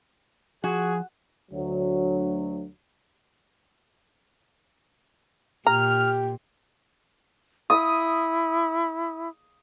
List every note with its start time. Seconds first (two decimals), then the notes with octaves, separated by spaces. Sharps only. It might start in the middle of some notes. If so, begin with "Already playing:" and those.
0.64 F3 F#4 G#4 G#5
1.51 D2 F#3
5.67 A#2 G4 A#5 F6
7.70 E4 D#6